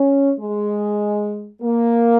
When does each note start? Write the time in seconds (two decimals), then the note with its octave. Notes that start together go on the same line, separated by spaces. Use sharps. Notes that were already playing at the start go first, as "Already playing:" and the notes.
Already playing: C#4
0.40 G#3
1.62 A#3